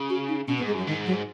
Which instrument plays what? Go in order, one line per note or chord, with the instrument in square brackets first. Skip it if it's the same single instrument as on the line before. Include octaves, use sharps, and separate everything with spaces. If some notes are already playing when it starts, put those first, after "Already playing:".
Already playing: [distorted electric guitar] C#3
[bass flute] F#4
D#4
[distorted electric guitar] B2 [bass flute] C#4
[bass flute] B3
[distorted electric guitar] G#2
[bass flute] G#3
[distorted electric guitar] F#2 [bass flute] F#3
[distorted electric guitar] G#2 [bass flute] D#3
[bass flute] F#3